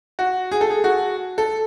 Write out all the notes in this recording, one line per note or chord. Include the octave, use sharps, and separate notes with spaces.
F#4
G#4
A4
G#4
F#4
A4